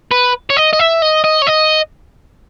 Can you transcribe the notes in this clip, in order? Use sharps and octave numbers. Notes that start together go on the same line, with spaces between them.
B4
C#5
D#5
D#5
E5
D#5
D#5
C#5
D#5